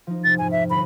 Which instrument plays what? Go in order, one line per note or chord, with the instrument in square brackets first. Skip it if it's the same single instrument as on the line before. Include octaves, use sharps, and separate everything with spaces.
[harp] F3 D#4
[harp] F2 C3 [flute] A6
[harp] F2 G#2 [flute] G#5
[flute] E5
[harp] G1 A#6 [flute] B5